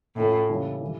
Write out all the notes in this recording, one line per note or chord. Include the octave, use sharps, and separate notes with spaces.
A2 A3 C#4 F4 A4 E5
C#3 E3 G3 C#4 E4
E3 G3